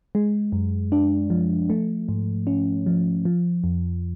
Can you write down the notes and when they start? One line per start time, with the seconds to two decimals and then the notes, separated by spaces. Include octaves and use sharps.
0.15 G#3
0.52 F#2
0.92 D4
1.30 F3
1.70 A3
2.09 G#2
2.47 C#4
2.86 F3
3.25 F3
3.64 F2